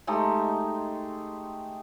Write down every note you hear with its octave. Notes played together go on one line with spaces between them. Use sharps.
G#3 A3 D#4 G4